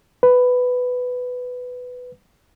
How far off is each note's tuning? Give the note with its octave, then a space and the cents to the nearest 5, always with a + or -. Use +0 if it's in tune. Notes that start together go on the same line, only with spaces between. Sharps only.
B4 +10